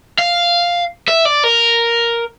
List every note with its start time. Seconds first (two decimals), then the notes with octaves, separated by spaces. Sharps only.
0.19 F5
1.08 E5
1.25 D5
1.44 A#4